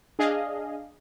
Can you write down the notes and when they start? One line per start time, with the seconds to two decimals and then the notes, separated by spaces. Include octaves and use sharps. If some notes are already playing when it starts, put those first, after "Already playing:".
0.19 D4 G#4 D#5 F5